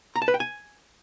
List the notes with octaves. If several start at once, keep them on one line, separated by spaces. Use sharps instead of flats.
A#5
A5
B4
G5
G#5